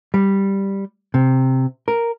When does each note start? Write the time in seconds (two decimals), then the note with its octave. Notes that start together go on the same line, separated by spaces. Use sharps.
0.14 G3
1.14 C3
1.88 A#4